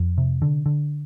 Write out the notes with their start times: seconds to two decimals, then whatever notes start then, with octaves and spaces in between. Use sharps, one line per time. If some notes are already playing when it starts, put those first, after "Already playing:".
Already playing: F2
0.18 C3
0.42 D3
0.66 D3